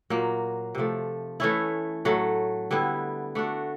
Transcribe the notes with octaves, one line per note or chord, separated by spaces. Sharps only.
A#2 F#3 A#3
C3 F3 A3
E3 A3 C#4 E4
A2 F#3 A3
D3 G3 B3 E4
A3 D4 F#4